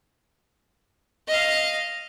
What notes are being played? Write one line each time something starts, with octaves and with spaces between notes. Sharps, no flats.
D#5 F5